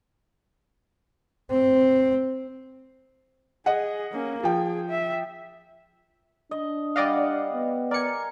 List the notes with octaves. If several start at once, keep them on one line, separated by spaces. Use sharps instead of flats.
C4
G#4 D#5 F#5
A#3 C#4
F3 G#4 G5
E5
D4 D#5
G3 D5 D#5 F5 F#5
B3
A#4 D5 G#5 C#7